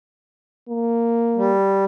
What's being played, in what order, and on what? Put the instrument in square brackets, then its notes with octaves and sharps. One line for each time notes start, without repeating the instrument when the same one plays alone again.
[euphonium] A#3
[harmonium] G3